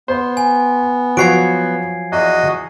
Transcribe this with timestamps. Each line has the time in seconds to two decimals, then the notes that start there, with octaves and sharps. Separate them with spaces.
0.08 B3 C5
0.37 G#5
1.17 F3 F#3 F#4 B4 C#5 G#6 C7 D7
2.12 E2 F#4 D#5